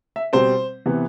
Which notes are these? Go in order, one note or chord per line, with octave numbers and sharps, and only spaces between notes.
E5
B2 G3 C4 C5
C3 E3 B3